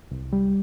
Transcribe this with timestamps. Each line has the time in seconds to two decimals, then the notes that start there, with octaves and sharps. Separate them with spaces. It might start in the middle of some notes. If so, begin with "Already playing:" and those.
0.11 C2
0.33 G3